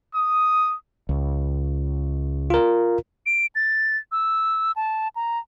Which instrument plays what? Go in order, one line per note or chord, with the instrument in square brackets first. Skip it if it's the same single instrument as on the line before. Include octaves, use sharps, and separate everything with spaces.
[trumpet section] D#6
[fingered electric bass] C#2
[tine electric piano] F4 A#4
[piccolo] D7
A6
E6
A5
A#5